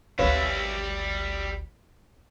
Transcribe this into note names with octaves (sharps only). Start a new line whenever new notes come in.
G#1 D2 G3 B4 C#5 E5 F5